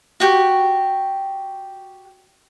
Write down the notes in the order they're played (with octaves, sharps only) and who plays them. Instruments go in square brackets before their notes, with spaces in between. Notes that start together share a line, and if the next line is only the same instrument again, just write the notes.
[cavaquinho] F#4 G4